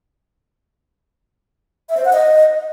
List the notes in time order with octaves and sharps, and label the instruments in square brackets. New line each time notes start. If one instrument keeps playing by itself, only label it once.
[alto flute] E5
C5
F#5
D#5